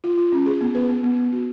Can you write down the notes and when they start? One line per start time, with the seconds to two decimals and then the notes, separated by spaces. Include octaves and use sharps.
0.04 F4
0.18 F4
0.32 C#4
0.46 G#4
0.61 B3
0.75 B4
0.89 B3
1.03 B3
1.18 B3
1.33 F#4